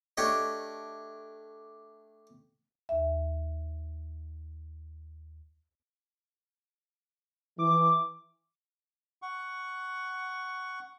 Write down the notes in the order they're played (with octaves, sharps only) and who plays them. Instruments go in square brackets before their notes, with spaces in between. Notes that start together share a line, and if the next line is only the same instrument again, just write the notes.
[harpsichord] A3 D4 G4 C#5 D#5
[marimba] D#2 E5
[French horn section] E3 [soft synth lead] D6
[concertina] F#5 C#6